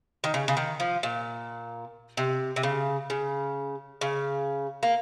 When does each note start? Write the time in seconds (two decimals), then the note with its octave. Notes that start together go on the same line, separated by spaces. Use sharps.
0.24 D#3
0.34 C#3
0.48 C#3
0.57 D#3
0.80 F3
1.03 A#2
2.17 C3
2.56 C3
2.63 C#3
3.10 C#3
4.01 C#3
4.83 A#3